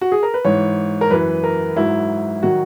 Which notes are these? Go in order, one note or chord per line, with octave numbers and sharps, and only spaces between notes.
F#4
G#4
A#4
B4
G#2 E3 C#5
A#4
F#2 E3 B4
A#4
G#2 F#3 E4
D#3 F#3 F#4